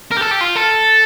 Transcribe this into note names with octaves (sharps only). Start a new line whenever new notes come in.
A#4
G4
A4
G4
F4
A4